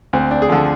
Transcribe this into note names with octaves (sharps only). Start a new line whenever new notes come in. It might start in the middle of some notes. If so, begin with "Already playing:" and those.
D2 C4
D4
G#4
D3 F3 A4